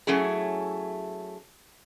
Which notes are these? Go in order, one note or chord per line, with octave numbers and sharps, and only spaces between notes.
F#3 A3 C#4 E4 G#4